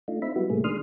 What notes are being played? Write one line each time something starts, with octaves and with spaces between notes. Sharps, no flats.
A3 D4 D#4 F4
C4 D#4 E5 B5
F#3 G3 B3 E4 F#4
A2 C3 G3 A3 A#3 G#4
D#3 G#3 D4 C6 D#6 F6